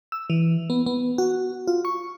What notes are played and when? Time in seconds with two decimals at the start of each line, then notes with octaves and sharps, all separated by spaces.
0.12 E6
0.30 E3
0.70 B3
0.86 B3
1.18 F#4
1.68 F4
1.85 C#6